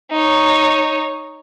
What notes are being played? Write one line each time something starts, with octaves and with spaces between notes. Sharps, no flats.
D#4 C#5